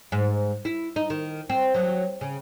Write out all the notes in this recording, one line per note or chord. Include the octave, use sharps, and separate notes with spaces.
G#2
E4
D#4
D#3
C4
F#3
C#3